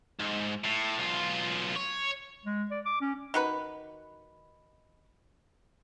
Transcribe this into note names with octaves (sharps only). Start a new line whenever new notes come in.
G#2
A2
B1 F4
C#5
G#3
D5
D6
C#4
D#3 F#4 B4